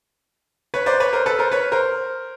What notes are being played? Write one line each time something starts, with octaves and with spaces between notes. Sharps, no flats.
B4 C#5
C5 D5
B4 C#5
A#4 C5
A4 B4
A#4 C5
B4 C#5
A#4 C5